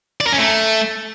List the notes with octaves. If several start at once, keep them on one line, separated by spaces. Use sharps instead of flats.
D5
A#4
C#4
A3